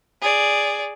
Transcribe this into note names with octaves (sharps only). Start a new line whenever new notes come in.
G#4 D5